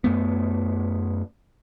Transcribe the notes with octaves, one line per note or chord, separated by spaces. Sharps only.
F#2 A3 B3